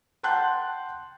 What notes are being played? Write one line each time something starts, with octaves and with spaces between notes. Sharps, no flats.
F#5 G5 A5 C6 F#6 G6